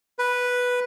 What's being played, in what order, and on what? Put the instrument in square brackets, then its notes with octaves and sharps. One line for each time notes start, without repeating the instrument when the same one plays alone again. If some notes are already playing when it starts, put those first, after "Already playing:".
[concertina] B4